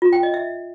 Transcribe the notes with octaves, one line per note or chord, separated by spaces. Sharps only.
F4
G5
D#5
E5